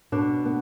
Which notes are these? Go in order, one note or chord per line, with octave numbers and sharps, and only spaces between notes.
B2 D4
B3